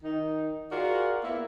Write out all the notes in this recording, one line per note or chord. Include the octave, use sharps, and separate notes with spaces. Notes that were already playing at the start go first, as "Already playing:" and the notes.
D#3 D#4
F4 F#4 G#4 A#4 D5
A#3 B3 E4